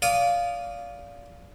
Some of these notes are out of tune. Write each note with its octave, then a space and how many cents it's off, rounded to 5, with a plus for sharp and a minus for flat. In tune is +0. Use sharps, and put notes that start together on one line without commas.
D5 -30 F5 +0 D#6 -15